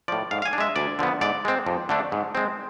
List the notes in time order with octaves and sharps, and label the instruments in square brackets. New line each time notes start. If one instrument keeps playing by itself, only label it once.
[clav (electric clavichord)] A2 F3 D5
G#2 F5
F5
G#5
D4
G#3 E5
D2 D5
D3 F3 B3
G#2 D5
G#3 C4
F2
D3 A3 D4
G#2
G#3 C4